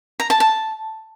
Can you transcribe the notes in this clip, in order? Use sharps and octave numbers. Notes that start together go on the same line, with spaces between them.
A#5
A5
A5